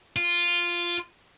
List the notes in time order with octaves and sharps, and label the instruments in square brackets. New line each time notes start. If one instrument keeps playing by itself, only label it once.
[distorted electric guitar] F4